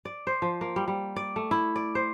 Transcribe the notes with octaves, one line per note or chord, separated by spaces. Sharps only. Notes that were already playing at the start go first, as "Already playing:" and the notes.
D5
C5
F3
A#3
G3
G3
D5
A3
E4
D5
C5